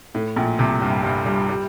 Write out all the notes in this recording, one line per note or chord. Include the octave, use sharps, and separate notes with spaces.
A2
A#1 A#2
C2 C3
G2 G3
G2 G3
G2 G3
G3